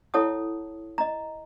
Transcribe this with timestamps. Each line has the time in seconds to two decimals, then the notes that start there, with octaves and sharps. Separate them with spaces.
0.14 E4 A4 C#5 F#5 A5 D#6
0.98 D#5 A#5